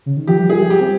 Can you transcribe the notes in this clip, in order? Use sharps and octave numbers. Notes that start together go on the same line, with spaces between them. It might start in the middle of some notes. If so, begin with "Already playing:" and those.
C#3
D#3
F3 G4
G3
F3 G#4
G3 G4
C4